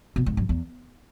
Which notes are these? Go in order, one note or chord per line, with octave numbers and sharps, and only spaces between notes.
B2
G#2
F#2
E2